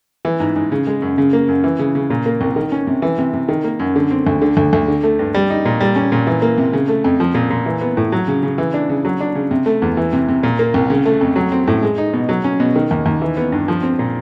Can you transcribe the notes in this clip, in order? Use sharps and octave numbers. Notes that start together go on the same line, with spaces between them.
E3
G#2
G#2
C#3
G#3
F#2
C#3
A#3
F#2
E3
C#3
C#3
A#2
A#3
C2
D#3
C#4
C3
E3
C3
C3
D#3
A#3
F#2
D3
C4
D2
D3
D2
D2
D3
A3
G2
G3
D#4
A#2
G3
C#4
A#2
E3
A#3
C3
C#3
A3
F2
F3
A#2
A#2
E3
B3
A2
F#3
C#3
C#3
E3
D4
C#3
F#3
D4
C#3
C3
A3
E2
E3
C3
C3
A#2
A#3
C2
C#3
A3
F2
F#3
C4
A2
G#3
D#4
B2
F#3
C#4
B2
D#3
D#2
D#2
E3
B3
G2
F3
C4
A#2